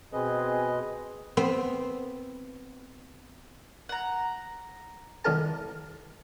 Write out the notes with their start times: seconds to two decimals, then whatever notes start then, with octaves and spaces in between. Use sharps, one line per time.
0.13 B2 C4 G#4 B4 D#5
1.37 B3 C4 C5
3.89 F#5 A#5
5.25 C2 D#3 A4 A#4 A5